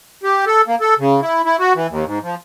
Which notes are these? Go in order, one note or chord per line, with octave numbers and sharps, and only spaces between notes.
G4
A4
A#3
A4
C#3
E4
E4
F#4
E3
D#2
G#2
F3